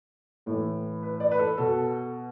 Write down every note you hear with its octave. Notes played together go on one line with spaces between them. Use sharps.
A2 E3 A4
B4
D5
B4
A4
B2 A4